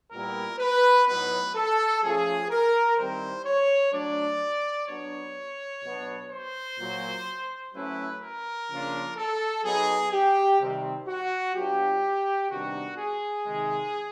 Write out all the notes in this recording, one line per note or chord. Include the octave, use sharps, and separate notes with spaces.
A#2 G3 B3 E4 A#4
B4
A2 F#3 B3 D#4 B4
A4
F3 A3 C#4 F4 G#4
A#4
D#3 G3 C4 E4 C5
C#5
F#3 A3 D4 D5
F#3 B3 D4 C#5
B2 F#3 B3 D4
C5
A#2 F#3 A#3
F#3 A3 C#4 E4 B4
A#4
C#3 F3 A#3 D4 F4
A4
F#3 B3 D#4 G#4
G4
C3 D#3 G3 C4
F#4
F#3 B3 D4 F4 G4
C3 D#3 G3 B3 D4 F#4
G#4
C3 D#3 G#3